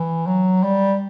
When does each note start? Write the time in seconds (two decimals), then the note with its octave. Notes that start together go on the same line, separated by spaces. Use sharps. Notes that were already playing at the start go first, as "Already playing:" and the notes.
Already playing: E3
0.27 F#3
0.63 G3